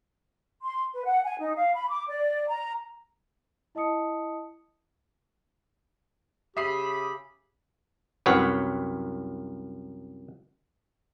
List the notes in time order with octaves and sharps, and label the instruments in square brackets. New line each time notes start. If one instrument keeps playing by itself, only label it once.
[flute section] C6
B4
F#5
G#5
D#4
F5
B5
D6
D5
A#5
[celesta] E4 D#5 A5 D#6 C#7
[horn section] C#3 B5 [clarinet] G4 [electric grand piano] E5 D#6 C7
[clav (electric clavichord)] C2 F#2 B4 C#5 F#5